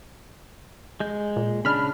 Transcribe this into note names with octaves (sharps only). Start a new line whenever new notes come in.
G#3 G6
A#2
C#3 D4 B5 F6